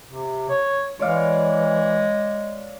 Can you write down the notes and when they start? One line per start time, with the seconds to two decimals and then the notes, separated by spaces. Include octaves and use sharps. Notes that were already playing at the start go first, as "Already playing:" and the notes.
0.10 C3
0.49 C#5
0.99 E3 G#3 C#5 D5 F5